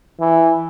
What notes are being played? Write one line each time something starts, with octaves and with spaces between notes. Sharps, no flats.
E3